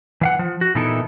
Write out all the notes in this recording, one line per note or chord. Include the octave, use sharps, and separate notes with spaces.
E3 F5 F#5
F3
F#4
A#2 E3 B3 D#4 E4 A4